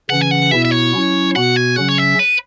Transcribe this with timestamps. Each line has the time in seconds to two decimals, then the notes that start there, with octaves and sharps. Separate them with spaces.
0.10 C#3 E3 C#4 F#5
0.21 G#5
0.31 F#5
0.51 B2 B3 E4 E5
0.65 E5
0.72 C#5
0.93 F#3 C#4 E4
1.35 B2 B3 F#4 F#5
1.56 G#5
1.76 C#3 F#3 C#4 F#5
1.88 C#5
1.98 E5
2.19 B4